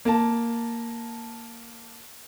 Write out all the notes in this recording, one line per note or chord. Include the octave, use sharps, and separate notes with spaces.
A#3 A5